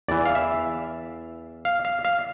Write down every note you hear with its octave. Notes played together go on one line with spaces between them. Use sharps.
E2 E3 D5
F5
E5
F5
F5
F5